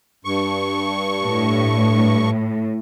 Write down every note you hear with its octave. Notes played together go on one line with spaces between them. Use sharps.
G2 C#6
A2